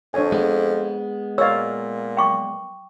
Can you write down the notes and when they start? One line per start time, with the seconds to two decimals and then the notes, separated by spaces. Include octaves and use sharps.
0.14 F2 D4 C#5 G#5
0.32 G#3 B3
1.38 A#2 C#5 D#5 F5 E6
2.17 G5 C#6 D6